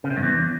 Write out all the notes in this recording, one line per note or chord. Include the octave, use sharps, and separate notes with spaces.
C#3
C3
G2
E2